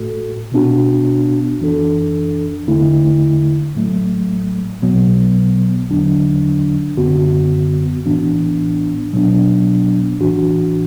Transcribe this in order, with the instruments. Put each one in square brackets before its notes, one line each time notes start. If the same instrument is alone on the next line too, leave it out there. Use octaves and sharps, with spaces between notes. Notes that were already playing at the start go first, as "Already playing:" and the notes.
Already playing: [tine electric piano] A2 A3 F#4 A4
B2 B3 D4 F#4
F#2 E3 D4 A4
E2 D3 A3 E4
A1 A2 F#3 A3
B1 B2 F#3 B3
E2 D3 F#3 D4
F#2 D3 B3 F#4
A1 A2 E3 B3 D4
B2 F#3 B3 D4
A1 A2 E3 D4 F#4